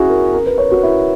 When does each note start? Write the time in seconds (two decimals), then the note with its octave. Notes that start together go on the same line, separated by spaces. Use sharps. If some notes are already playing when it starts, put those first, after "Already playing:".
Already playing: C#4 E4 F#4 G#4
0.09 A#4
0.33 A#4
0.46 B4
0.58 C#5
0.71 F#4
0.83 E4